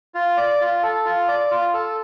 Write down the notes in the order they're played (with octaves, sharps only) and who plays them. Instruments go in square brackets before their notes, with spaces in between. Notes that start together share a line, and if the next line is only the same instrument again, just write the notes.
[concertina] F4
D5
F4
A4
F4
D5
F4
A4